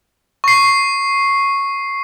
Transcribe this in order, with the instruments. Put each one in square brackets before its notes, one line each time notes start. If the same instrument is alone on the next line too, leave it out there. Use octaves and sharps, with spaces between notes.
[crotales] C#6 C7